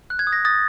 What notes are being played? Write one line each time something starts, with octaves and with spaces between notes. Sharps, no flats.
F#6
G#6
D#6
A#6
D#6 A6